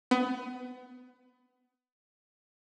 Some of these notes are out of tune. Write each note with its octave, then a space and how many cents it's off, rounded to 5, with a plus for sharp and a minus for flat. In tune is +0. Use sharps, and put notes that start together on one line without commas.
B3 +25